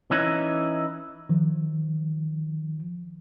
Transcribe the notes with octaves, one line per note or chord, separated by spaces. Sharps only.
E3 C#4 D#4 E4
D#3 F3